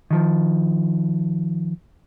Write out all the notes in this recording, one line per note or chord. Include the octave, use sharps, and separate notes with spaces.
D#3 F3